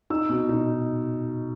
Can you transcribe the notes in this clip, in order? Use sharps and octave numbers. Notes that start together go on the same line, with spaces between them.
D#4 E6
B2
D#4